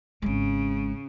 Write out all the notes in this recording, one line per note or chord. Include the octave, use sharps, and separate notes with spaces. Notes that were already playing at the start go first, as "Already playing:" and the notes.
G#1 C#3 G#3